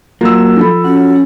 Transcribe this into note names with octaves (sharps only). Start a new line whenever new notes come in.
F#3 A#3 F4 E6
F3 A4 B5
C#4 F#4